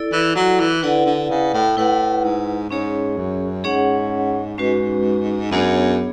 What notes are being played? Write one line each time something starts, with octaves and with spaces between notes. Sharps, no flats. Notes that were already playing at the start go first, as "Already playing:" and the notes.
Already playing: E4 A4 D5
E3
F#3
E3
D3 E4 B4 D5 F#5
D3
C#3
A2
A2 E4 B4 F#5
G#2
G#2 C#4 G#4 C#5
F#2
G#2 C#4 G#4 C#5 F#5
G#3 C#4 F#4 B4
F#2 B3 D4 G#4 C#5